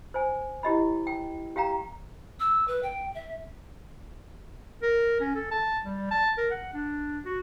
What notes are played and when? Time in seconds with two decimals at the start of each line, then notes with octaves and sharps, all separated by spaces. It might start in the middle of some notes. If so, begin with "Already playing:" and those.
0.14 C5 G#5
0.63 E4 G4 D#5 B5
1.07 G5
1.56 G4 F5 G5 A#5
2.40 E6
2.68 B4
2.83 G5
3.15 E5
4.82 A#4
5.21 C#4
5.35 A4
5.51 A5
5.85 G3
6.11 A5
6.38 A#4
6.51 F#5
6.74 D4
7.25 F#4